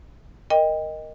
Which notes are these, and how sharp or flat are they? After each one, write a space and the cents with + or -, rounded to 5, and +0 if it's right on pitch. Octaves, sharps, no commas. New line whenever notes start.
A#4 +0 D#5 +0 G5 +25